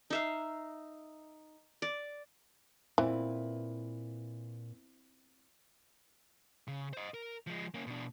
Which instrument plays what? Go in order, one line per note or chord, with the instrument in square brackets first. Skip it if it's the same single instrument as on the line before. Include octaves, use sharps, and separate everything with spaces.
[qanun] D#4 E5 F5
D5
[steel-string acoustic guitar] A#2 B4 [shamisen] E3 [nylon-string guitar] C4 E4
[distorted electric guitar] C#3
C5 D#5
A#4
F3 G#3
A#3 C#4
B2 D4